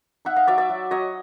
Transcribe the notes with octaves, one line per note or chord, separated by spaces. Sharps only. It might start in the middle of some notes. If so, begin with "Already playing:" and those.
D#4 E5 F#5
D#5 F5
F#3 D5 E5
D5 E5
F#3
F#3 C#5 D#5